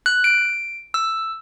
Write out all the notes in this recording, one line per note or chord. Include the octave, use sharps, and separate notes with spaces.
F#6
D7
E6